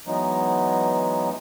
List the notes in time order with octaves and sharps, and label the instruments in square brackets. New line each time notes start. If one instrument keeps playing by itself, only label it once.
[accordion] E3 F#3 G#3 B3 D#4